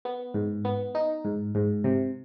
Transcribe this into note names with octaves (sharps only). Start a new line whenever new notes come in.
B3
G#2
B3
D#4
G#2
G#2
C3